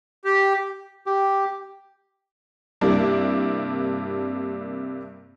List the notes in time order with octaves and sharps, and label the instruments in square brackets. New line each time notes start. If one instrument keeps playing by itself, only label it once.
[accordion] G4
[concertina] G4
[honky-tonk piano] G2 C3 A#3 D4 E4